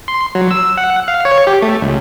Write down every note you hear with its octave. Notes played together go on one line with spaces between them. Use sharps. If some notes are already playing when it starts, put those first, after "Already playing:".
C6
F#3
E6
F#5
F5
C#5
G4
A3
C#2